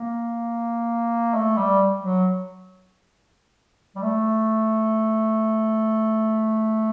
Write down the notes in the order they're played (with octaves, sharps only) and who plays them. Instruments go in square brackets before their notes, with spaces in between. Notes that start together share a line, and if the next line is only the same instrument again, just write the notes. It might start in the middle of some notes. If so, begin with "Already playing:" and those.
Already playing: [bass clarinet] A#3
A3
G3
F#3
G3
A3